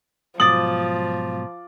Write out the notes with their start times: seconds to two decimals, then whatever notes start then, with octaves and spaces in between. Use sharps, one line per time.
0.40 G#2 B2 F3 F#3 D6 D#6 A6 F#7